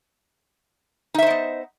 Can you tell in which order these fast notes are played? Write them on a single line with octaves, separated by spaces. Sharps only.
D#4 E5 C5 D#5 B3